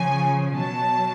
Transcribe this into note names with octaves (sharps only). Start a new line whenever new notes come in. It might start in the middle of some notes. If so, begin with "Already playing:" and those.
Already playing: C#3 F3 G#5
B2 F#3 A5